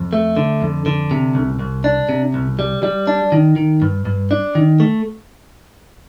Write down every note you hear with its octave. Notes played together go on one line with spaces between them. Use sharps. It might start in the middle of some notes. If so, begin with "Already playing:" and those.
Already playing: F2
A3
D3
F2
D3
C3
C2
C2
D4
C3
C2
G3
G3
D4
D#3
D#3
G2
G2
D4
D#3
A3